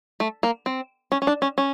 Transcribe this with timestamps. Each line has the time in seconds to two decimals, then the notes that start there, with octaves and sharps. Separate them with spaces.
0.20 A3
0.43 A#3
0.66 C4
1.12 C#4
1.22 C#4
1.27 D4
1.42 C#4
1.58 C#4